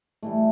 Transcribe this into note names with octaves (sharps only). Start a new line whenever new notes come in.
A2 E3 G3 A3